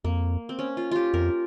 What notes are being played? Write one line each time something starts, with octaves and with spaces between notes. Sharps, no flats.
F2 A#3
C4
C#4
F4
F4 G4
F2 A#4